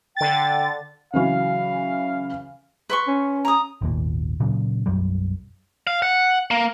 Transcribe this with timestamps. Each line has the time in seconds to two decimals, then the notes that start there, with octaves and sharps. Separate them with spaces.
0.16 D3 G5 A6
1.14 C#3 E3 F#3 F5
2.89 B4 C6 C#6
3.08 C#4
3.45 A#5 D#6
3.81 G#1 D#2 A#2
4.40 A#2 C#3 F#3
4.86 B1 F#2 F#3 G3
5.87 F5
6.02 F#5
6.51 A#3